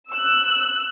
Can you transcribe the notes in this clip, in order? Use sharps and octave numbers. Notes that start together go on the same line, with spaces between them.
E6 F#6